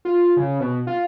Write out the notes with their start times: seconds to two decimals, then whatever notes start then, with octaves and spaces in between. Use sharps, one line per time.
0.05 F4
0.37 C#3
0.60 B2
0.87 F4